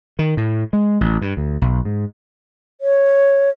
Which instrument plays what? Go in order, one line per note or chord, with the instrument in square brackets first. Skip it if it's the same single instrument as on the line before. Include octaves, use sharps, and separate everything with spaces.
[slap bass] D#3
A2
G#3
A1
G2
D2
B1
G#2
[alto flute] C#5